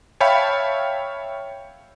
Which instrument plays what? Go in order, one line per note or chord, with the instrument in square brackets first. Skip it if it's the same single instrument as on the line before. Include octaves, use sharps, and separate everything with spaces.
[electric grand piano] C#5 E5 F5 G5 A5 B5